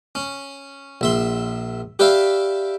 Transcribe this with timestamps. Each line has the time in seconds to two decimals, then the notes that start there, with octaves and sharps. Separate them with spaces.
0.15 C#4
1.01 A#1 E5 C6
1.99 G4 B4 D5 E5 F5